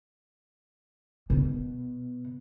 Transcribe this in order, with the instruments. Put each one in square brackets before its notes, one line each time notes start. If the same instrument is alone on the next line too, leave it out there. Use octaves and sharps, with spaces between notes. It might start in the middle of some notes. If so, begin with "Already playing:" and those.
[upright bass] B2